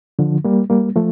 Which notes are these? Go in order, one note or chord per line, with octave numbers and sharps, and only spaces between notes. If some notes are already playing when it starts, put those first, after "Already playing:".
D3 F3
G3 A#3
G3 A#3
F3 A3